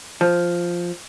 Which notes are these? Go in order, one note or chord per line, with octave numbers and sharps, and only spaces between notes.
F3